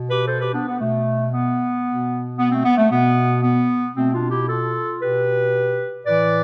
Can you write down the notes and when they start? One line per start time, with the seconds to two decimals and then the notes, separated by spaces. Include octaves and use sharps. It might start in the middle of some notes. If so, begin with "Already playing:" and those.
Already playing: B2
0.11 G4 B4
0.28 A4 C5
0.41 G4 B4
0.54 B3 D4
0.68 B3
0.81 B2 A3
1.33 B3
1.86 B2
2.39 B3
2.51 A3 C4
2.65 B3
2.78 A3
2.92 B2 B3
3.44 B3
3.96 B2 A3 C4
4.14 D4 F4
4.31 E4 G4
4.49 F4 A4
5.02 B2 G4 B4
6.06 A2 E3 B4 D5